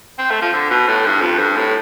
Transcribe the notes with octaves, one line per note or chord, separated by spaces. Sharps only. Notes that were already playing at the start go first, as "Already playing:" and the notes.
C4
A3
F3
D3
B2
A2
G2
F2
G2
A2